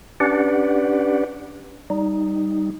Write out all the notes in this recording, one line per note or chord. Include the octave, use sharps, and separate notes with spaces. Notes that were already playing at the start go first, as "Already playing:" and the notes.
C#4 D4 G4 B4 D5 F#5
G3 D#4